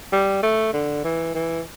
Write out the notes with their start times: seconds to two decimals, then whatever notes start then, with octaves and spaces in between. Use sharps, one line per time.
0.12 G3
0.43 A3
0.73 D3
1.04 E3
1.34 E3